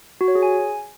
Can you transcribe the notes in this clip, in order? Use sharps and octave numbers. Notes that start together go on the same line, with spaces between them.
F#4
C#5
G#4
G#5